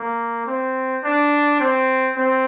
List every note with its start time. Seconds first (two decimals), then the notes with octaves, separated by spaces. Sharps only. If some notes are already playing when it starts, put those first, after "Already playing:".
Already playing: A#3
0.46 C4
1.04 D4
1.60 C4
2.17 C4